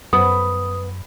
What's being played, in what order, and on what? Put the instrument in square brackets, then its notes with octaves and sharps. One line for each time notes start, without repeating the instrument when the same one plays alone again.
[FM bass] F#2 [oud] B3 [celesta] D#6